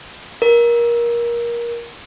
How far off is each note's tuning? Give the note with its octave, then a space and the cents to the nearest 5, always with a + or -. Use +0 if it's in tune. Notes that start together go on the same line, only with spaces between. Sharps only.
A#4 +20